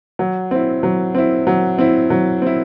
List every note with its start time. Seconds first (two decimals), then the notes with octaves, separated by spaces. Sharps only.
0.19 F#3
0.51 C4 E4
0.83 F#3
1.15 C4 E4
1.47 F#3
1.78 C4 E4
2.10 F#3
2.42 C4 E4